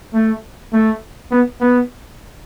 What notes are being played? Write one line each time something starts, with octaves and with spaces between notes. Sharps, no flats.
A3
A3
B3
B3